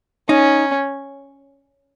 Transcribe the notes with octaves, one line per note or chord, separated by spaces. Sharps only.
C#4 D#4